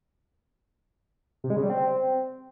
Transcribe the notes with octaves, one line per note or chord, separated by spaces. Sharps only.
C3
G#3
C#3
G3
C4